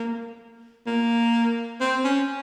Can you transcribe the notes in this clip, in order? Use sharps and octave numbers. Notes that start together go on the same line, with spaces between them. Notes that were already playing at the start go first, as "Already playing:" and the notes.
Already playing: A#3
A#3
C4
C#4